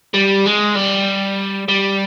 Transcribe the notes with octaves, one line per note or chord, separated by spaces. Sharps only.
G3
G#3
G3
G3